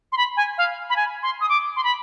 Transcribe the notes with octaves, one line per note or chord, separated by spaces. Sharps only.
C6
B5
G#5
F5
B5
G#5
C6
D#6
D6
C6
B5